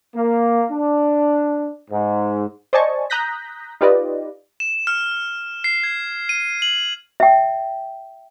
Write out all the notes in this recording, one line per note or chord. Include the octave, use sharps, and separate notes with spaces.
A#3
D4
G#2
C5 D5 D#5 G#5 A5 C#6
A#5 D#6 F#6 G6 A#6 B6
D#4 F4 G4 B4 D5 D#5
E7
F6
C7
G#6
D#7
F#7
E5 G5